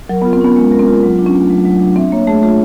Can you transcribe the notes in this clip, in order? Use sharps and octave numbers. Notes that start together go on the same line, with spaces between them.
F#3 A#4
B3
F4
C4
B3 C#4
G#3
A#4
C4
F4
F#3
D4
C#4
A3
F#3
F#3
D4
C4 E5
A#3 C#5
A3 G#4
A3 F4